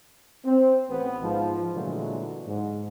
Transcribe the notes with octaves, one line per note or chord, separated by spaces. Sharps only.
C4
A1 B3
G#2 F3
A#2 D3 E3 F#3 G#3 A3
G#2